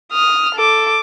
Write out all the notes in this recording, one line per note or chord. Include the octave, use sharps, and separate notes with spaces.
D#6 F6
A4 D6